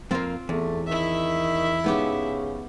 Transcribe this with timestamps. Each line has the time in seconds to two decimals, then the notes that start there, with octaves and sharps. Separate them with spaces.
0.11 F2 A#3 C4 F4
0.49 E2 A3
0.87 D#3 E4 E5
1.84 G#2 C#3 B3 G4